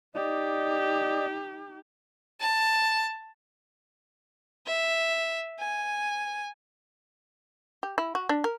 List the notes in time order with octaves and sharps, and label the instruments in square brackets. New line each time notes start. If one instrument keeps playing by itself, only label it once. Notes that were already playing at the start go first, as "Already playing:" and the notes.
[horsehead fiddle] D#4 G4 [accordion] D5 D#5
[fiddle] A5
E5
G#5
[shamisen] G4
E4
F#4
D4
A#4